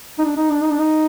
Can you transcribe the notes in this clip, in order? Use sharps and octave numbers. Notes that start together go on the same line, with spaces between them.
D#4
D4
D#4
D4
D#4
D4
D#4